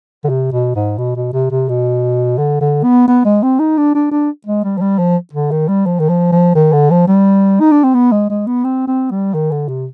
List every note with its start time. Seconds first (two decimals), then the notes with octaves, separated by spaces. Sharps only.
0.24 D3
0.29 C3
0.52 B2
0.75 G#2
0.98 B2
1.16 B2
1.33 C3
1.51 C3
1.69 B2
2.38 D3
2.61 D3
2.84 B3
3.08 B3
3.25 G#3
3.43 C4
3.59 D#4
3.77 D4
3.95 D4
4.11 D4
4.46 G#3
4.64 G3
4.77 F3
4.81 G3
4.98 F3
5.33 D3
5.51 D#3
5.68 G3
5.86 F3
5.99 D#3
6.09 F3
6.32 F3
6.55 D#3
6.72 D3
6.90 F3
7.07 G3
7.60 D#4
7.71 D4
7.83 C4
7.94 B3
8.12 G#3
8.30 G#3
8.47 B3
8.64 C4
8.87 C4
9.11 G3
9.34 D#3
9.51 D3
9.68 C3